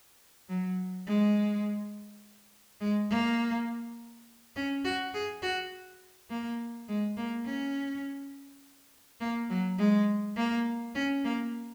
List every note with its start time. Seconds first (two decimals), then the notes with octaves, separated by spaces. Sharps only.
0.49 F#3
1.07 G#3
2.81 G#3
3.10 A#3
4.56 C#4
4.84 F#4
5.14 G#4
5.43 F#4
6.30 A#3
6.88 G#3
7.17 A#3
7.46 C#4
9.20 A#3
9.49 F#3
9.78 G#3
10.36 A#3
10.95 C#4
11.24 A#3